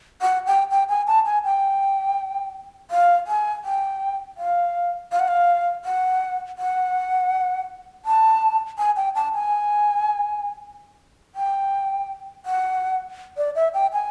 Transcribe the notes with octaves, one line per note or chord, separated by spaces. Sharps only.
F#5
G5
G5
G#5
A5
G#5
G5
F5
G#5
G5
F5
F5
F#5
F5
F#5
F#5
A5
G#5
G5
A5
G#5
G5
F#5
D5
E5
G5
G#5